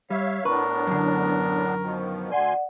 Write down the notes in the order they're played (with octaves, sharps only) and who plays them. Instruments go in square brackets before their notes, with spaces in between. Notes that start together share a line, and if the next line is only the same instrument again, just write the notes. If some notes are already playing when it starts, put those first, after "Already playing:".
[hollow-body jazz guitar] G3 [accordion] C#5 E5 F5
[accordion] A2 B3 D4 [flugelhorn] A#4 [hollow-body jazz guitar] B4 [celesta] C#6
[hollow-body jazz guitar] F#2 D3
[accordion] B2 D#3 F3
[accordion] D2 G#5 C6 [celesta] D5 F#5